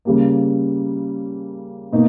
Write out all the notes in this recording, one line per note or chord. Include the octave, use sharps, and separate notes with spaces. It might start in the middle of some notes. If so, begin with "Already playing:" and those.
C#3 G3 A#3
B2 A#3 D#4